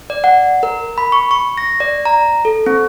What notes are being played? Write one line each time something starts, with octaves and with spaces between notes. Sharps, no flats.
D5
F#5
A#4
B5
C#6
C#6
A#6
D5
A#5
A4
C4